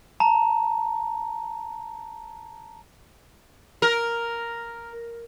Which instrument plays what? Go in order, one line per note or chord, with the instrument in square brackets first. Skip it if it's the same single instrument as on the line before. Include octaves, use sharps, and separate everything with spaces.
[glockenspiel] A5 A#5
[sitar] A#4